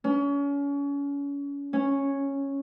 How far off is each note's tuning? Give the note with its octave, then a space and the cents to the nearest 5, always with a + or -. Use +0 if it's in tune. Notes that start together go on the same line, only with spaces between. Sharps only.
C#4 +35
C#4 -5